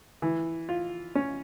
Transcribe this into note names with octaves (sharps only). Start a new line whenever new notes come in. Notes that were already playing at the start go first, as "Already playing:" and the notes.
E3
F4
C#4